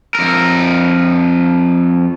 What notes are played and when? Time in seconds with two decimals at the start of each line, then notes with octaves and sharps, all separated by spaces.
0.15 F2 A#4